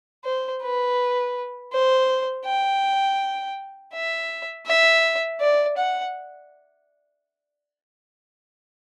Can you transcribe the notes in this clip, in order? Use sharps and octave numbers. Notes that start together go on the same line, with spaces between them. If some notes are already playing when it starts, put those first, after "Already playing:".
C5
B4
C5
G5
E5
E5
D5
F#5